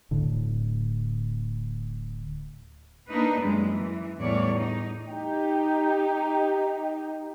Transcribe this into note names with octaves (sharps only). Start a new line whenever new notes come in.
D1 A2 D3
A#3 D4 D#4 B4
F#2 G3 G#3
E3
E2 A2 G3 A3 C#5 D5
D#4
D#4 G4